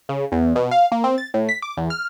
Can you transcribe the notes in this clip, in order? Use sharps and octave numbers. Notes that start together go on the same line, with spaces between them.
C#3
E2
B2
F5
A#3
C4
A6
A2
B6
D6
E2
F6